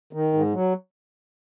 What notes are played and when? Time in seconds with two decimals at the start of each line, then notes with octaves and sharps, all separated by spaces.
0.13 D#3
0.33 G#2
0.54 F#3